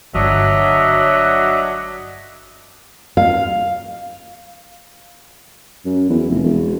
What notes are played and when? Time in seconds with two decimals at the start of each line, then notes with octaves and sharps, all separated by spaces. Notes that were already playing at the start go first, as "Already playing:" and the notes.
0.14 G1 F#3 D4 D#5 E5
3.17 F5
5.85 F#2
6.09 E2
6.29 F1
6.44 E1